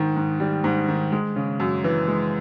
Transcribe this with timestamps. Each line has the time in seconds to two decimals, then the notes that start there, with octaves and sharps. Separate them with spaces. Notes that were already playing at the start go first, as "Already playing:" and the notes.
Already playing: G#2 D#3
0.16 G#2
0.40 G3
0.64 G#2
0.88 D#3
1.12 G#3
1.36 C#3
1.60 F#2
1.84 E3
2.08 G#3